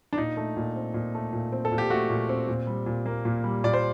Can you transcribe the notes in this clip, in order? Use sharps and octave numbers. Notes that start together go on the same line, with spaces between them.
D4
A#2 D#4
A3
A#2
C4
A#2
A3
A#2
C4
A4
A#2
G4
A3 F#4
A#2
C4
A#2
G3
A#2
A#3
A#2
G3
A#2 D5
C5